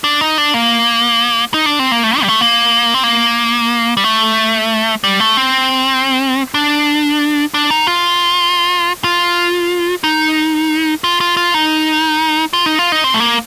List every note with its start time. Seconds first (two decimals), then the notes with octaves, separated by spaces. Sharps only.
0.04 D4
0.21 D#4
0.38 D4
0.54 A#3
1.54 D#4
1.66 D4
1.79 C4
1.92 A#3
2.03 A3
2.17 D#4
2.24 G3
2.28 A3
2.41 A#3
2.94 C4
3.03 A#3
3.97 G3
4.04 A3
5.04 G3
5.20 A3
5.37 C4
6.54 D4
7.54 D4
7.70 D#4
7.87 F4
9.04 F4
10.04 D#4
11.04 F4
11.20 F4
11.37 F4
11.54 D#4
12.53 F4
12.66 D#4
12.79 F4
12.92 D#4
13.04 C4
13.14 A3
13.20 A#3